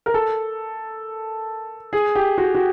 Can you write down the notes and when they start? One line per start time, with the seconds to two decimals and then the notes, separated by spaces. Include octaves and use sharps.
0.06 A#4
0.14 A4
1.93 G#4
2.15 G4
2.38 F#4
2.55 F#4